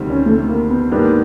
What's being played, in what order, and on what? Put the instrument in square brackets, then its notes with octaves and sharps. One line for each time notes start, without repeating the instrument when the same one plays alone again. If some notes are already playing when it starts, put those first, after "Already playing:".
Already playing: [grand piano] D2 C3 D#3 G3 C4
[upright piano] C#4
A3
A#3
B3
[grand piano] G#2 D#3 G3 B3 D4 [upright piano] A#3